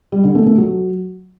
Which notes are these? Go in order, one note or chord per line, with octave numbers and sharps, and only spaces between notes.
G3
D3
A3
A3
F#3